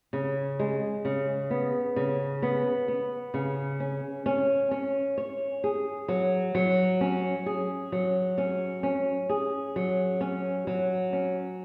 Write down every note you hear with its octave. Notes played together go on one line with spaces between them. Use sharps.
C#3
G#3
C#3
B3
C#3
B3
B3
C#3
C#4
C#4
C#4
C#5
G#4
F#3
F#3
C#4
G#4
F#3
C#4
C#4
G#4
F#3
C#4
F#3
C#4